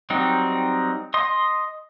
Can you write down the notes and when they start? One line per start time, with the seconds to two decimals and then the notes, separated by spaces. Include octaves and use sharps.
0.10 F#3 G3 C4 D#4
1.14 D#5 C6 D#6